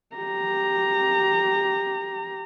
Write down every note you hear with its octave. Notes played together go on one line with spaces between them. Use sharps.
G4 A#5